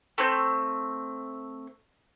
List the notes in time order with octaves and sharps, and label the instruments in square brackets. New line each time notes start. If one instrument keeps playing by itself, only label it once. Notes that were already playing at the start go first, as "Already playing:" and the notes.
[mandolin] A3 C4 G6